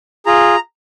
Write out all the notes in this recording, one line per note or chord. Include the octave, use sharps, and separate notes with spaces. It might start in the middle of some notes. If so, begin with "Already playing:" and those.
F4 G#4 A#5